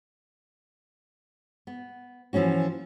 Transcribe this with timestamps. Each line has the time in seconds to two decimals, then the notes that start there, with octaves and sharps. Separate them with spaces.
1.67 B3
2.33 E3 F3 A#3 C#4 F#4